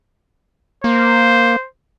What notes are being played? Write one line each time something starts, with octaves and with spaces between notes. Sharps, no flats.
A#3 C5